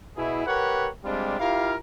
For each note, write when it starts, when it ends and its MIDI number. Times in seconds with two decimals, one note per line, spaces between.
0.17 0.45 47
0.17 0.45 64
0.17 0.45 68
0.47 0.88 67
0.47 0.88 70
0.47 0.88 71
0.47 0.88 73
0.47 0.88 78
1.04 1.37 55
1.04 1.37 56
1.04 1.37 60
1.04 1.37 62
1.04 1.37 65
1.04 1.37 67
1.40 1.75 64
1.40 1.75 65
1.40 1.75 67
1.40 1.75 70
1.40 1.75 77